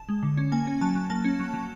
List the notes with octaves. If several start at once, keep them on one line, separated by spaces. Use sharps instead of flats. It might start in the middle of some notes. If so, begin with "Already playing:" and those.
Already playing: A5
G#3
D3
C#4
A#3 G#5
C#4
F#3 A5
F#3
A#3 A5
C#4
F#3
F#3